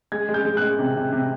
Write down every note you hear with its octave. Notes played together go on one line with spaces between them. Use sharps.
G#3 G#6
G#3
G6
G#3
G#3 F#6
C3
C3
C3